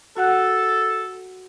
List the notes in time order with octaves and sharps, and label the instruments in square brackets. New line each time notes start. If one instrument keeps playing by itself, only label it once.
[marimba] F#4 F#5 F#6 [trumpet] A4